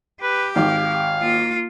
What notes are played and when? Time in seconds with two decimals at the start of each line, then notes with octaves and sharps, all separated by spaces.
0.22 G4 B4
0.56 G#1 F5
1.19 A#3 F4